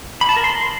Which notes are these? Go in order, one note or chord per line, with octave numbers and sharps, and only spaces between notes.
B5
A5
A#4
C6